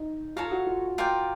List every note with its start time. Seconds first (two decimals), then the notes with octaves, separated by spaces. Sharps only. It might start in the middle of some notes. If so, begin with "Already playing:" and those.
Already playing: D#4
0.36 F4 A4 C#5 F5 A#5
0.52 F#4
0.67 F4
0.98 F4 A#4 D5 G5